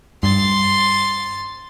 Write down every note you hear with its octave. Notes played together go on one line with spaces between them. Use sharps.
G2 C6 A6